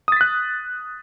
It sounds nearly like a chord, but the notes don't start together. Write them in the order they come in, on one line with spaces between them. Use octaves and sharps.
D#6 A6 B6 F#6